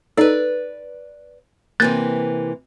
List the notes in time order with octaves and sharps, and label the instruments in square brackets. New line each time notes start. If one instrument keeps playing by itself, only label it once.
[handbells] D#4 A4 [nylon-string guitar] B4 D5
[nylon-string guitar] C3 E3 A#3 [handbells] F#6 G6 A6